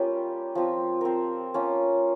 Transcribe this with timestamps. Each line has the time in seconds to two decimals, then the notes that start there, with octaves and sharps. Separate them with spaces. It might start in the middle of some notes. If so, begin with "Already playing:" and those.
Already playing: G3 A#3 C#4 F4 G4
0.55 F3 C4 F4
1.01 C4 A#4 C5
1.54 A#3 C#4 F4 C#5